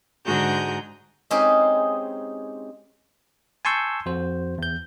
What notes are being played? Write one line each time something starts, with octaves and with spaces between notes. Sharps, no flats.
G#2 D3 F#4 G#4 A#5 G6
G#3 C4 C#4 D#4 G4 G#4
G#5 A5 C6 C#6 E6 G6
F2 F#4 C5
E2 G6